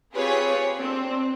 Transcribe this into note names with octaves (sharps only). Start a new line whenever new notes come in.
C4 F4 G4 G#4 B4 C#5
C4 D4